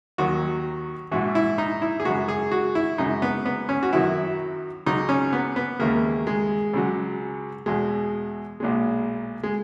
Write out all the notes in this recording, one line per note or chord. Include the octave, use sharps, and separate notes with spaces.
D#2 D#3 F#3 F#4
A#1 G#2 E3 F#4
E4
D#4
E4
G#4
F#2 C#3 G#3 F#4
G#4
F#4
E4
F#2 C#3 G#3 D#4
B3
B3
C#4
F#4
F#2 D#3 F#3 E4
C#2 C#3 F#3 D#4
C#4
B3
B3
D#2 C#3 E3 G#3 A#3
G#3
C#2 C#3 F#3
E2 B2 G#3
B1 A#2 G#3
G#3